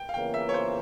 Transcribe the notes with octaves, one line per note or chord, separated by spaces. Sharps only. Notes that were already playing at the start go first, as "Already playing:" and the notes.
Already playing: G5
F5
E2 C#3 E3 A#3 F4 G5
E5
C#5
C5